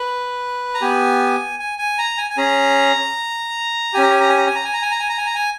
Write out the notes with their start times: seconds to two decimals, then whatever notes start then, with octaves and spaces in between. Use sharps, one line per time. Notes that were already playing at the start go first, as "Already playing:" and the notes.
Already playing: B4
0.74 A#5
0.81 B3 G4 G#5
1.59 G#5
1.79 G#5
1.98 A#5
2.18 G#5
2.30 G#5
2.37 C#4 G#4 A#5
3.94 G4 G#5
3.97 C#4 A#5
4.11 G#5
4.20 A#5
4.29 G#5
4.37 A#5
4.47 G#5
4.55 A#5
4.64 G#5
4.73 A#5
4.82 G#5
4.91 A#5
4.99 G#5
5.09 A#5
5.18 G#5
5.26 A#5
5.35 G#5